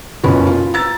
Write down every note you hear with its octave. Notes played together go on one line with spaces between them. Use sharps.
F#1 B2 C#4 F4 B5
F4
A#5 E6 A6